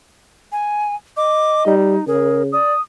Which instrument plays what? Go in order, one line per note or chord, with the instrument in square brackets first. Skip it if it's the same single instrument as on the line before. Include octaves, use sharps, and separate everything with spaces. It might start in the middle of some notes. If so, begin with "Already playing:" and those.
[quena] G#5
[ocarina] D#5 [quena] D6
[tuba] G3 [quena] D#4
[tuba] C#3 [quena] G#4 [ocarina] A#4
[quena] D5 [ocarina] D#6